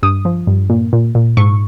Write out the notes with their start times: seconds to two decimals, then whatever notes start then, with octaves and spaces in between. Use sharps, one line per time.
0.03 G2 D#6
0.25 F3
0.47 G2
0.70 A#2
0.93 A#2
1.15 A#2
1.37 G#2 C#6